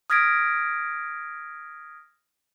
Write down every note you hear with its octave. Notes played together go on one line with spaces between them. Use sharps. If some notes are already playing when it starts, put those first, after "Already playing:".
D#6 F6 G#6 A#6 B6 D7